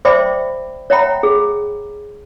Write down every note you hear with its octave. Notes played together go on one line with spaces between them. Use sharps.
C5 D5 E5 G5 B5 D6
C#5 E5 F#5 G5 A#5 B5
G#4